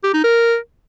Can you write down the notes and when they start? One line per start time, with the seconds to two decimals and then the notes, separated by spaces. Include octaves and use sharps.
0.04 G4
0.14 D#4
0.24 A#4